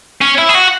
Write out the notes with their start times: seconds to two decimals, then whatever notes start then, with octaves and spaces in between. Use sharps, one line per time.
0.21 C#4
0.38 E4
0.49 G#4
0.55 F#4